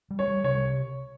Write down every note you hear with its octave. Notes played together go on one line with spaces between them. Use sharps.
G3
C#5
G3
C3 C#5